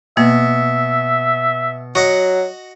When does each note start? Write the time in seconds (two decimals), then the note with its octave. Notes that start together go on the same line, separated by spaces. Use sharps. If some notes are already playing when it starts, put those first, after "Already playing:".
0.17 B2 A#3 E5
1.95 F#3 F#4 D#5 F#5 C#6